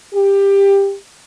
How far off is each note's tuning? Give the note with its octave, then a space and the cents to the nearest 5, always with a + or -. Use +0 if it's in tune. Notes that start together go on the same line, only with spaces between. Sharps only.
G4 +15